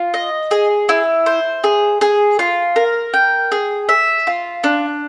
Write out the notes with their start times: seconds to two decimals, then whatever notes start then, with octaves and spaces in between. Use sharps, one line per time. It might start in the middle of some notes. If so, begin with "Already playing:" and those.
Already playing: F4
0.14 D#5
0.51 G#4
0.89 E4
1.26 C5
1.64 G#4
2.01 G#4
2.39 F4
2.76 A#4
3.14 G5
3.52 G#4
3.89 E5
4.27 F4
4.64 D4